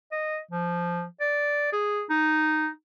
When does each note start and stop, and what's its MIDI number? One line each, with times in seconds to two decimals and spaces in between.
0.12 0.39 75
0.51 1.04 53
1.21 1.69 74
1.73 2.03 68
2.10 2.69 63